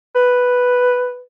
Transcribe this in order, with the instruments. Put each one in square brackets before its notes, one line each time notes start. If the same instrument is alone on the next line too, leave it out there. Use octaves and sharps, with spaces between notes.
[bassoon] B4